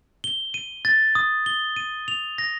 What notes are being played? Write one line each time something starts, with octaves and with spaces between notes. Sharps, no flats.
G7
D#7
A6
D#6
G7
D#7
F7
A#6